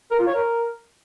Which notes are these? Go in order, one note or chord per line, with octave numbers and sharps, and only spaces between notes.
A#4
F4
C#5
A#4